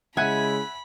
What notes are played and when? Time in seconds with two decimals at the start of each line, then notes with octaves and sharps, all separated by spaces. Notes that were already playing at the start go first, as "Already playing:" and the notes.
0.17 C#3 G#3 E4 E5 F#5 G#5 B5